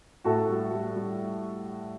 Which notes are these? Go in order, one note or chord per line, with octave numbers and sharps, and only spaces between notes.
A2 F#4 A4
G3
G3
G3